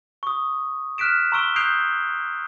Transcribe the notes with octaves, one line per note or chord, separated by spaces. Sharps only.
C#6 D#6
F6 F#6 B6 D7 E7
A#5 C6 C#6 E6 D7 G7
D#6 F#6 G6 C7 D7 F7